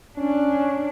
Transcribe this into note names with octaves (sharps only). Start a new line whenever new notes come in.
C#4 D4